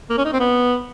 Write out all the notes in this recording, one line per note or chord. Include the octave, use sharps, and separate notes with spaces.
A#3
C#4
D#4
C4
B3